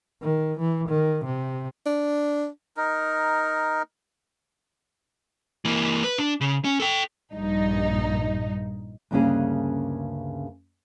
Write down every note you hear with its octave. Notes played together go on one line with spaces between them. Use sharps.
D#3
E3
D#3
C3
D4
D#4 A#4
E3 A#3
B4
D4
C#3
C#4
A4 G5
A#1 G2 D#4
D2 G2 C#3 A#3 C#4 G#4